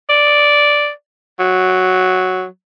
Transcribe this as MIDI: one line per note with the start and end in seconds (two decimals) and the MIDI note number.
0.09 0.89 74
1.39 2.44 54